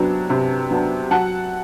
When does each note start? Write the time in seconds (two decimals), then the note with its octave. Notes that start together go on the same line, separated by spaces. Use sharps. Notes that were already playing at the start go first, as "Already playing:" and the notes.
Already playing: C3 F#3 B3 D4
0.30 C3
0.71 F#3 B3 D4
1.11 F#3 F#5 A5